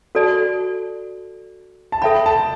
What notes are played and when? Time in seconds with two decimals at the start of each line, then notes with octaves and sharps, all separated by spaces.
0.15 F#4 A4 D5 A5
1.92 A5
2.02 A4 E5 G5 B5
2.26 A5